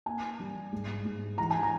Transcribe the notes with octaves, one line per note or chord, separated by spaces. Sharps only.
A#3 G#5
G3
G#2
G#2
E3 A#5
G#5
A#5